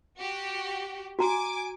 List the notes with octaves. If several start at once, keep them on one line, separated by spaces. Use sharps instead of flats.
F#4 G4
F#4 G#5 A#5 D6